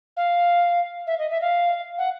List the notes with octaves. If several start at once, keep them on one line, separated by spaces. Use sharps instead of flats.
F5
E5
D#5
E5
F5
F#5